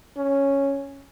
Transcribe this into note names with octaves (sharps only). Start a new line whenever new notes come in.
C#4